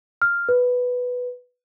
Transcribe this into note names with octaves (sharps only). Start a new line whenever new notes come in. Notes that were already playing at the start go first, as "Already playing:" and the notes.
F6
B4